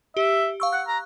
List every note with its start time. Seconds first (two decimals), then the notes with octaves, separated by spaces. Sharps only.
0.17 G4 E5
0.60 F5 C#6 E6
0.73 F#5 F#6
0.87 A#5